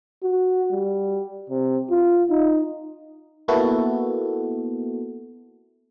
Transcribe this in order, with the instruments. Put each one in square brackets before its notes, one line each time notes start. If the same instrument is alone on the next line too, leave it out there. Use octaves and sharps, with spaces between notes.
[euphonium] F#4
G3
C3
F4
D#4
[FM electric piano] A#3 B3 E4 F#4 A4